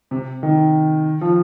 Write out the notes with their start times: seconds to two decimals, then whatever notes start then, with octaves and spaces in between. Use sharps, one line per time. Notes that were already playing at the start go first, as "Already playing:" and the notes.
0.11 C3
0.43 D#3
1.21 F3